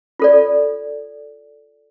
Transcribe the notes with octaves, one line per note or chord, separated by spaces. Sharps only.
F4 A4 D5